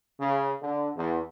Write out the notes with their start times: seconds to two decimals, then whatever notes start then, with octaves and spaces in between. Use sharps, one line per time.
0.20 C#3
0.62 D3
0.96 E2